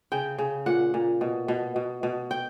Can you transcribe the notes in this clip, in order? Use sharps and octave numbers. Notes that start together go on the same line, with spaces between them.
C#3 G5
C#3
A#2 F#5
A#2
B2
B2
B2
B2
G5